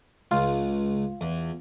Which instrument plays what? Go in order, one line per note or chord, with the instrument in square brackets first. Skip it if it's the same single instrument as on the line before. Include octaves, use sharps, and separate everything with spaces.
[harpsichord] C#2 [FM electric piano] F4
[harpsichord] E2